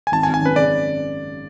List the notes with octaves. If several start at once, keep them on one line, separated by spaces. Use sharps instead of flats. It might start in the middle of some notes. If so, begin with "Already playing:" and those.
G#5
G#1 A5
G#5
G#1
G#5
F#2 B4
C#3 D5